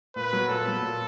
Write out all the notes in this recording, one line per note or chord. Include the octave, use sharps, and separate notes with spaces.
A#2 B4
F#3 B3
A#2 A4
F#3 B3
A#2